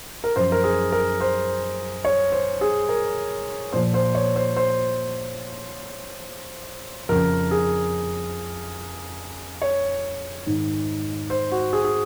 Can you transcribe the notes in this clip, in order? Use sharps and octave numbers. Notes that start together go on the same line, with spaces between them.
A#4
F#2 F3 C5
A#4
G#4
A#4
C5
C#5
C5
G#4
A#4
A#2 F3 C5
C5
C#5
C5
C5
F2 C#3 F3 A#4
G#4
C#5
G#2 D#3
C5
F#4
G#4
G#4